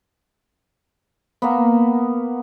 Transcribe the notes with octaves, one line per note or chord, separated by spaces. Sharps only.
A#3 B3